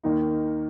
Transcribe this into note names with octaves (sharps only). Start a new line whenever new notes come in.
D#2 D#3 A#3 D#4